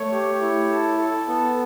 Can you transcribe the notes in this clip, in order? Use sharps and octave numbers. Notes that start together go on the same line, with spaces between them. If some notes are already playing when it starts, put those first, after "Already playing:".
Already playing: A3 C#5
G4
E4
A4
A4
B3 A4